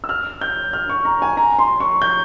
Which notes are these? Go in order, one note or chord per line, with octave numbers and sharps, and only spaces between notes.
E6
F6
G6
F6
C#6
A#5
G#5
A#5
C6
C#6
G6